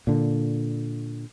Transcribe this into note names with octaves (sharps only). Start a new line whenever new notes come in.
A#2 D3